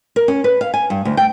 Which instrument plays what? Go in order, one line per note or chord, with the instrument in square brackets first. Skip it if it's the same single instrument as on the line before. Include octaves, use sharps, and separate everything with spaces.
[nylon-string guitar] A#4
C#4
B4
F5
G#5
G2
D2
G5